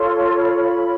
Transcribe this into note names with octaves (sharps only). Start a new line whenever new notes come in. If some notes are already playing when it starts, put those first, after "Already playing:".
Already playing: F4 A4 C#5 C6
B5